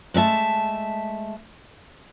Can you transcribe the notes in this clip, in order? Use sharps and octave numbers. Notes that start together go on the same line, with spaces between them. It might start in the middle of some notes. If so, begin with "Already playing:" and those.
G#3 A3 E5 A5